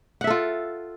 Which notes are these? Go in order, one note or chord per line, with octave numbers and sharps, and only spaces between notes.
F4 A4 E5 F#5